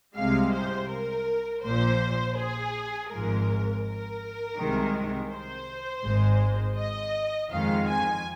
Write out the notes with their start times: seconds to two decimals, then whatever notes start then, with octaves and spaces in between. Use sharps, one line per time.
0.16 C2 C3 G#3 F5
0.53 C5
0.90 A#4
1.63 A#1 A#2 F3 C5
2.37 G#4
3.10 G#1 G#2 F3 G#3 A#4
3.84 A#4
4.57 C2 C3 D#3 G#3
5.31 C5
6.04 G#1 G#2 G#3
6.77 D#5
7.51 F2 D#3 G#3 F5
7.89 G#5